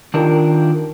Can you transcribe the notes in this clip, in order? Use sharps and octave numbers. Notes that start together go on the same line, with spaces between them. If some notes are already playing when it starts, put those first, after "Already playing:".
D#3 D4 F4 G4 A#4